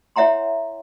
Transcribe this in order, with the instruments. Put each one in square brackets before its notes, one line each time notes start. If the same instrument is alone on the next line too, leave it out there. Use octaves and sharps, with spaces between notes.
[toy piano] E4 C#5 E5 F#5 A#5 C6